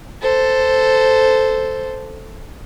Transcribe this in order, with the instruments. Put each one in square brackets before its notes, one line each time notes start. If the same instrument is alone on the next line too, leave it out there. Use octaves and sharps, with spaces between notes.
[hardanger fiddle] A4 C5